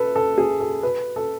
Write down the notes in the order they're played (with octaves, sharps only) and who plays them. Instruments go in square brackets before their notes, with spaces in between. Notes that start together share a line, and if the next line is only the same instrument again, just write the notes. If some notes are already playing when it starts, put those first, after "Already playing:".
Already playing: [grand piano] A4 B4
A4
G#4
A4
B4
A4